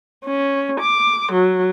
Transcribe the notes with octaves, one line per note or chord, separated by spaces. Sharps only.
C#4
D6
F#3